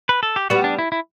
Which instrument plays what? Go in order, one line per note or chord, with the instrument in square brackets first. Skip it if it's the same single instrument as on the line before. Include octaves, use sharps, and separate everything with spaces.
[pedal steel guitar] B4
A4
G4
[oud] G3 B3 [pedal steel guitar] F#4
[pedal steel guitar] D4
E4
E4